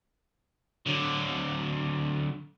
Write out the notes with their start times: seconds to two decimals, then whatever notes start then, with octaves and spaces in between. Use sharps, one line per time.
0.86 D3 F#3